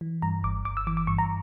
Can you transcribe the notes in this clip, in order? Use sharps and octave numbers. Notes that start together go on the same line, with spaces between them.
E3
G2 A#5
G1 D6
G1 D6
E6
E3 D6
D6
G2 C#6
A#5